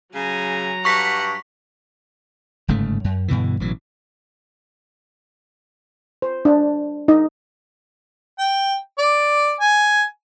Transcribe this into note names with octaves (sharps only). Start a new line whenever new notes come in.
C#3 F#3 G#5 A#5
G2 F#5 C#6 B6
G1 G#2 C#3 A3
F#2
G2 B2 D3 E3
A1 B2 E3 F#3
C5
D4
D#4 D#5
G5
D5
G#5